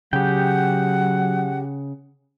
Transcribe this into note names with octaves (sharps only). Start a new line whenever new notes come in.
C#3 F#3 G4 F#5 G5